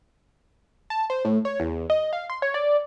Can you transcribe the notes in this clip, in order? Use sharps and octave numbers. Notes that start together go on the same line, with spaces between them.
A5
C5
A2
C#5
E2
D#5
F5
C6
C#5
D5